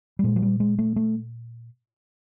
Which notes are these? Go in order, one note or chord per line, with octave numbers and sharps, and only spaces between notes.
G3
A#2 G#3
F#3
G3
G#3
A3
A3